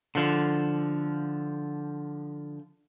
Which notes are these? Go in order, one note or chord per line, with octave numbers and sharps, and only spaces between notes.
D3 F3